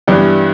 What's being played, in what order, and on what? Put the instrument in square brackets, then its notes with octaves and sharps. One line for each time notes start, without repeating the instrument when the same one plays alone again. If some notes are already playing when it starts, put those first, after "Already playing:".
[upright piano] G2 E3 B3 D4 G4